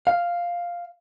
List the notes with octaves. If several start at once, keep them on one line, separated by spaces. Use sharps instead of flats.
F5